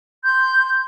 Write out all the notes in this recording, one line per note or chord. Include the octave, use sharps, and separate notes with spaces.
C6 G6